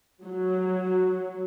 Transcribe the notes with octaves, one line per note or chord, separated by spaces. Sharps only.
F#3